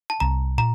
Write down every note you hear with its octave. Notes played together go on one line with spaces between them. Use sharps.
A5
C2 A#5
A#2 A#5